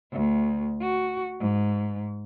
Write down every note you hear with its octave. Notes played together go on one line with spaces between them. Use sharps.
D2
F#4
G#2